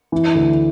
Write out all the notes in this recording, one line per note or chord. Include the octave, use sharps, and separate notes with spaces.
E3
D2